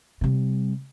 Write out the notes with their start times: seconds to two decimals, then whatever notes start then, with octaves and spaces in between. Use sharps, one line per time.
0.21 C3 G3